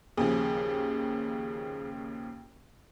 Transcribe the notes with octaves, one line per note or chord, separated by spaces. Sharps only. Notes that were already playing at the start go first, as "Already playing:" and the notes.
D#2 C#3 F3 G#4